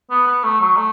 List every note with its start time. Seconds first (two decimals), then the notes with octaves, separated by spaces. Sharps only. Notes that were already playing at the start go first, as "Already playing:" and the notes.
0.10 B3
0.27 B3
0.43 A3
0.61 F#3
0.76 A3